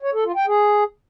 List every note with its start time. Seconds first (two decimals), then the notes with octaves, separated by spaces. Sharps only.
0.02 C#5
0.13 A4
0.25 F4
0.36 G5
0.47 G#4